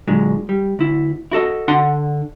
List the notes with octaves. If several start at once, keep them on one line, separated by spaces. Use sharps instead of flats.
A#2 D3 F#3 G#3
G3
D2 E4
E4 F#4 A4 D#5
D3 D4 F#5 C6